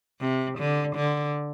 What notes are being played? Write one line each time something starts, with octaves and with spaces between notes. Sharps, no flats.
C3
D3
D3